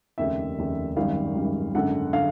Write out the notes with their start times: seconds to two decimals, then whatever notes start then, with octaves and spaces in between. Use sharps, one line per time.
0.18 F1 D#2 C#3 E5
0.58 F1 D#2 C#3
0.96 G#1 F#2 D#3 G3 F5
1.35 G#1 F#2 D#3 G3
1.74 G#1 F#2 D3 F#5
2.13 D3 F5